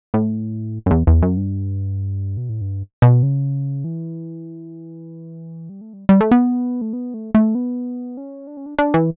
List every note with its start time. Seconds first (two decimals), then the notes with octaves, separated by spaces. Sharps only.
0.14 A2
0.86 F#2
0.91 E2
1.07 E2
1.23 F#2
1.37 G2
2.37 B2
2.49 A2
2.61 G2
3.02 B2
3.23 C#3
3.84 E3
5.69 G3
5.81 A3
5.93 G3
6.09 G3
6.21 A3
6.31 B3
6.82 A3
6.93 B3
7.14 A3
7.35 A3
7.55 B3
8.17 C#4
8.47 D4
8.57 C#4
8.66 D4
8.79 D4
8.94 E3